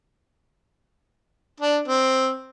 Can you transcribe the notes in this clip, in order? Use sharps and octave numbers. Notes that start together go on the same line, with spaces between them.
D4
C4